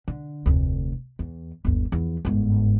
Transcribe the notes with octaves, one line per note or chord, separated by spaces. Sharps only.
D3
F1 D2
E2
G1 D#2
E2 F3
G1 G#2